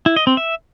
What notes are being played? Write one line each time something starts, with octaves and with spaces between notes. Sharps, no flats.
E4
D#5
C4
E5